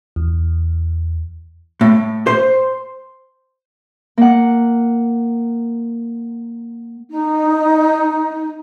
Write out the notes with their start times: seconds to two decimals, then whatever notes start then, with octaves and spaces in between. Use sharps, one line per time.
0.16 E2
1.81 A2
2.27 C5
4.18 A#3 F#5
7.10 D#4